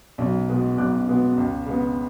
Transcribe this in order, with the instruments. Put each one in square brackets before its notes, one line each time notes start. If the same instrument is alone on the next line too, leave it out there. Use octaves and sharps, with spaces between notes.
[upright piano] B1
B2 G#3 B3
B1 D6 F#6
B2 G#3 B3
C#2
C#3 G#3 B3